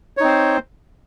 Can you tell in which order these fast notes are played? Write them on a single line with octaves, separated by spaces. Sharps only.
C#5 D#4 C4 C5